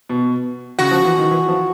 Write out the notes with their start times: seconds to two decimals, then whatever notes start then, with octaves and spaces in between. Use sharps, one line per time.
0.09 B2
0.79 C#3 F#4
0.91 F3
1.05 E3
1.18 D#3
1.31 E3
1.49 F3